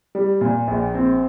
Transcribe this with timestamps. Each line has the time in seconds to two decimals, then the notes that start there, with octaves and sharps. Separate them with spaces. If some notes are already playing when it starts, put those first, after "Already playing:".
0.15 G3
0.41 A#2
0.67 A#1
0.95 C4